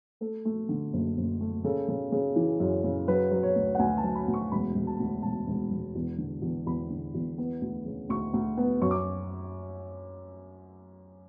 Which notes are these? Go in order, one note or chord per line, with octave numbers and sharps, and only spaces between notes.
A3 A4
A3
D3
F#1
F#1
A3
C#3 A4
C#3
C#3
E3
F#2
C#3
F#3 B4
F#3
C#5
D2
F#5
D2 G#5
A5
F#3
B5
D2
C#6
E1 B5
E1
A5
D2
E1 A5
E1
E1
E2
D3
E2
E2 B5
D3
E2
B3
D2
C#3
D2 C#6
D2
B3
F#2 C#6
D6